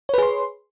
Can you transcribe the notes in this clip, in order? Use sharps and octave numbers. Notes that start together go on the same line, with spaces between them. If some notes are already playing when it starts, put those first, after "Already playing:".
G#4 B4 C#5 C6